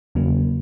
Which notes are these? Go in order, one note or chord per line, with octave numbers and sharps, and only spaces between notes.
E2 C#3 F#3 A#3